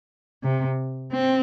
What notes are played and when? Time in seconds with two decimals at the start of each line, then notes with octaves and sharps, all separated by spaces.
0.43 C3
1.13 C4